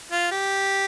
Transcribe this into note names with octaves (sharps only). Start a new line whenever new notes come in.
F4
G4